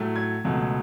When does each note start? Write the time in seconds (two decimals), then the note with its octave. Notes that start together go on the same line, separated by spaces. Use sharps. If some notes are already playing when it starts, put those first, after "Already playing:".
Already playing: A2 F#3 A3
0.16 G#6
0.44 C#2 B2 F#3 A3